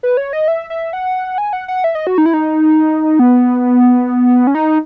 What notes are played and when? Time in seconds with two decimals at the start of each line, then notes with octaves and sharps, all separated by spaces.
0.03 B4
0.17 C#5
0.33 D#5
0.48 E5
0.70 E5
0.93 F#5
1.38 G#5
1.53 F#5
1.68 F#5
1.84 E5
1.95 D#5
2.07 F#4
2.18 D#4
2.26 E4
2.34 D#4
3.19 B3
4.47 C#4
4.55 D#4